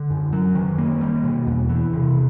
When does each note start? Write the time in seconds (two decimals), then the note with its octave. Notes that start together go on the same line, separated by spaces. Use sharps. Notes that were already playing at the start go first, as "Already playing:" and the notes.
Already playing: D3
0.10 F#2
0.33 F#3
0.55 D#3
0.78 A#3
1.01 G3
1.24 B2
1.47 E2
1.69 E3
1.93 C3